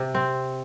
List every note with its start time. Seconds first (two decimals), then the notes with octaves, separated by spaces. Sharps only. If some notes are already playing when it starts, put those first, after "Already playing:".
Already playing: C3
0.15 C4